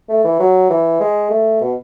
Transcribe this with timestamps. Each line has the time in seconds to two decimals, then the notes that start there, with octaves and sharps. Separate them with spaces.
0.09 A3
0.25 E3
0.39 F#3
0.70 E3
1.00 G#3
1.30 A3
1.61 B2